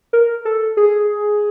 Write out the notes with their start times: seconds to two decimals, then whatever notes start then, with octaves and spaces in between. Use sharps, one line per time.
0.13 A#4
0.45 A4
0.77 G#4